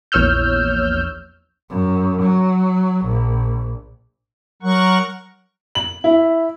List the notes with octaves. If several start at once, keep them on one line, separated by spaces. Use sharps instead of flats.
A#1 E2 C#5 E6 F6 G6
F#2
F#3
A#1
F#3 A#4 F#5 C#6
F#7
E4